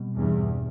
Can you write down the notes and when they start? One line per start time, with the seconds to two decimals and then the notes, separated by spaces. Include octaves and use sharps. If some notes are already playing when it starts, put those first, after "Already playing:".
Already playing: B2 G3 C4
0.15 E2 G2